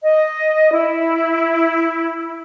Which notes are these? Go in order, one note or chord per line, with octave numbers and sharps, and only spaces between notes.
D#5
E4